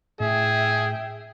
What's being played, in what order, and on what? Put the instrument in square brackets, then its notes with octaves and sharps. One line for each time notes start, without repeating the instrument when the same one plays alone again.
[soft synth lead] A2 [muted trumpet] G#4 [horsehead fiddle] E5 G5